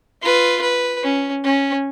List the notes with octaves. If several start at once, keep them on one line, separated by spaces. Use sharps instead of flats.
F4 B4
B4
C#4
C#4